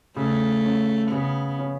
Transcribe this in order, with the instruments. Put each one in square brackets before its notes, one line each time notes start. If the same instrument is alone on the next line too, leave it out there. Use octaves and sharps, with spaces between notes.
[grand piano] C#3 [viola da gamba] A3
[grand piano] C#4
[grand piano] C#3 [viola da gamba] B3
[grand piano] C#4